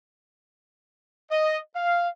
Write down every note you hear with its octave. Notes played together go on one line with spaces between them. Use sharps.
D#5
F5